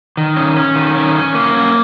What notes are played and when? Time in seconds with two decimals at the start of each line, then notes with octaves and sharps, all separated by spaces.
0.17 D#3
0.37 C#4
0.57 C#4
0.76 D#3
0.95 C#4
1.15 C#4
1.34 A#3
1.55 C#4